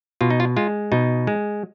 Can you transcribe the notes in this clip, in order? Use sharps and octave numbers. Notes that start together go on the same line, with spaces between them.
B2 F4
D#4
F4
G#3 F4
B2 D#4
G#3